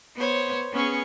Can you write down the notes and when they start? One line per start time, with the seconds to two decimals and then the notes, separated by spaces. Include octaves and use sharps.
0.16 B3 C5 C#5
0.72 B3 C#4 G#4 C#6